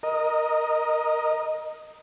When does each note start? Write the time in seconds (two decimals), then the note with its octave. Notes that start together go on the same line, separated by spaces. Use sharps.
0.03 A#4 D#5